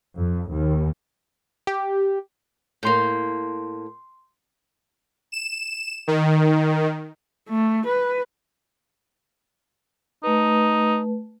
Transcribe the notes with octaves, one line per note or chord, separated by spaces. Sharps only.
F2
D#2
G4
A2 A#3 C6 G6
E7
D#3
A3
B4
A3 D#4 B4